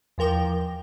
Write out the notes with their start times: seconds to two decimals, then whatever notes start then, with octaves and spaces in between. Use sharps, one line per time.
0.18 E2 F3 A#4 G5 D6